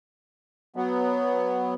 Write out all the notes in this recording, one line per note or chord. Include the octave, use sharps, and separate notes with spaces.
F#3 B3